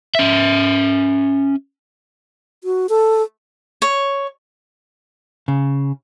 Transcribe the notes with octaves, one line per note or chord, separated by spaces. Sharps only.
C#4 E5
F#4
A4
C#5
C#3